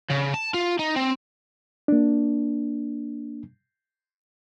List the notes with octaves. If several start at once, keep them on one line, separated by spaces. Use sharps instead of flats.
C#3
A5
F4
D#4
C4
A#3 D4